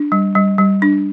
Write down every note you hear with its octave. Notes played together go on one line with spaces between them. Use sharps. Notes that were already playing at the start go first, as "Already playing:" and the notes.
Already playing: D4
G3
G3
G3
D4